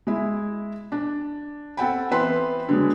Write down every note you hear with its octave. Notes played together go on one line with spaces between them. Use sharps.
G#3 E4
D4
C4 A4 F#5 G5 B5
E3 B3 C4 B4 B5 C6
D3 F#3 G#3